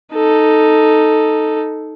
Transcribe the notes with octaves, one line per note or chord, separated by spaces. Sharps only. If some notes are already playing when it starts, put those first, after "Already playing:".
D#4 A4